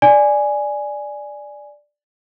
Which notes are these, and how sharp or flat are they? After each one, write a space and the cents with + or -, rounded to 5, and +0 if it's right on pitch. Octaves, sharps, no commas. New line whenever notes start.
D5 +0 G#5 +0